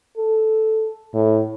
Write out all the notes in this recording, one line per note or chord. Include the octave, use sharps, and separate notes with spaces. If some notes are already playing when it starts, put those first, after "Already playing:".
A4
A2